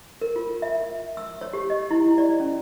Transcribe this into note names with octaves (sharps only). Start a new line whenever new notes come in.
A#4
F4
E5
E6
C#5
G4
D#5
E4
D5
C#4